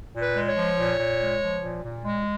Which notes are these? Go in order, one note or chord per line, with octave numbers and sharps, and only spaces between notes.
A#2
B4
G#3
C#5
F3
A#2
A#2
G#3
F3
A#2
A#2
G#3